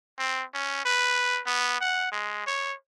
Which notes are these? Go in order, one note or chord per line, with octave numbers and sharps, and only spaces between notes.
C4
C#4
B4
B3
F#5
G#3
C#5